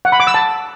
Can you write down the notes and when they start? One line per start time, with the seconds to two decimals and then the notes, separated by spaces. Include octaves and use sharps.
0.05 F#5
0.12 B5
0.20 D6
0.27 E6
0.34 A5